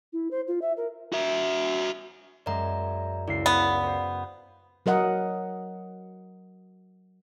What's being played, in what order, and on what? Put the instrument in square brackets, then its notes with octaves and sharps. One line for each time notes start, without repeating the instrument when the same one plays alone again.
[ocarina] E4
C5
F4
E5
A#4
[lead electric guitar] F#4 E5
[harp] F#2 G#3 [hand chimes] D5 E5 A#5
[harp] C#2 C7 [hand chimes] E4 D5
[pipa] B3 [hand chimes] D5 F5
[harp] F#4 C5
[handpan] F#3 A#4 D#5 F#5